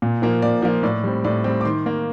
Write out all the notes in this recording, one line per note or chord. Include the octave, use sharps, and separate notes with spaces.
A#2
F3 A#3
A#2 D5
F3 A#3
A2 D5
G3 C4
A2 D5
G3 C4
D6
D#3 C6
A#3